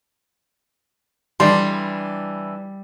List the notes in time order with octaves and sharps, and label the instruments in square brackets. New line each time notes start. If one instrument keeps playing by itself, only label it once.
[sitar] E3 D4 [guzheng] G3 [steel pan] C6